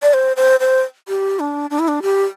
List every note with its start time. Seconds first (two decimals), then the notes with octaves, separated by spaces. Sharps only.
0.03 D5
0.14 C5
0.37 C5
0.60 C5
1.08 G4
1.40 D4
1.70 D4
1.79 E4
1.88 D4
2.02 G4